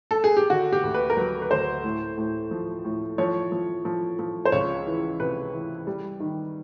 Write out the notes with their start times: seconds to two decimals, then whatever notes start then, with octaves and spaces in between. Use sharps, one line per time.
0.11 A4
0.24 G#4
0.37 G4
0.50 D3 F#4
0.72 G4
0.84 D2
0.94 B4
1.10 A#4
1.17 F#3 B4
1.42 B4
1.51 D2 C5
1.84 A2
2.18 A2
2.51 F3
2.85 A2
3.18 F3 C#5
3.52 F3
3.85 F3
4.19 F3
4.45 C5
4.52 C#2 C#5
4.86 E3
5.20 C3 B4
5.53 E3
5.87 G3
6.20 D#3